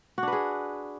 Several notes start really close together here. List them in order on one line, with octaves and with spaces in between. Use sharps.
F#4 D4 B4 G#4